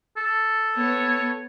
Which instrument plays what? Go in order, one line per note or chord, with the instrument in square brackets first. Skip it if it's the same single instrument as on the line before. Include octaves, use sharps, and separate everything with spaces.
[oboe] A4
[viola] B3 C#5